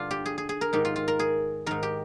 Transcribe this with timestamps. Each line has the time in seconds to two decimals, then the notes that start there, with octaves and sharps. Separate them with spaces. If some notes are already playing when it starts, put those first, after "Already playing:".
Already playing: G2 D3 D4 F4
0.11 G4
0.26 G#4
0.38 G#4
0.49 G#4
0.61 A#4
0.73 G#2 D#3 G4
0.85 F4
0.96 F4
1.08 A#4
1.19 G#4
1.66 G#2 D#3 A#4
1.83 G4